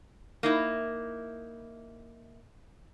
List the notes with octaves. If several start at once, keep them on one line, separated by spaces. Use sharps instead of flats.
A#3 D#4 E4